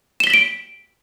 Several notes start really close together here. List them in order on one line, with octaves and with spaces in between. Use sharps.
E7 G7 B6 F#7 D7